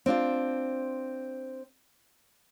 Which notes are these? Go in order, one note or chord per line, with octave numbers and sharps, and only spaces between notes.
C4 D4 F4 C5